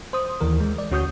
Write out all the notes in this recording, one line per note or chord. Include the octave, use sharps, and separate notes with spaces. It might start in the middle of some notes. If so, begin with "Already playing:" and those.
C5 D#6
D#2 E3 A#4
G#3
D5
D2 C#4 F#4 C#6 D#6 G6